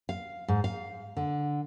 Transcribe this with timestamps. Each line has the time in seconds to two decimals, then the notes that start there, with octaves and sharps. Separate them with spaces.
0.09 F5
0.48 G#2
0.64 F5
1.17 D3